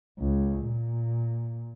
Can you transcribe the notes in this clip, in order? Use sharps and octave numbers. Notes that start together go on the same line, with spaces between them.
C#2
A#2